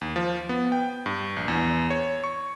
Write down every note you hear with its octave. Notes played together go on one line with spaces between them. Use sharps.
D#2
F3
B3
G5
G2
A#1
E2
C#5
C#6